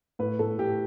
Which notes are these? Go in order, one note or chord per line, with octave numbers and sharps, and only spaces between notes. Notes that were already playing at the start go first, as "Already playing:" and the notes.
A2 B4
A2 A4
A2 G4